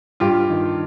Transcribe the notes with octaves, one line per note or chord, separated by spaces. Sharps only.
G2 F4 G4
D#3